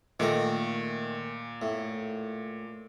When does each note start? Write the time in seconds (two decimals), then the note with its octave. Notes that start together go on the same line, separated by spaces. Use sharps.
0.20 A#2 D#3 A3 A#4
1.62 A2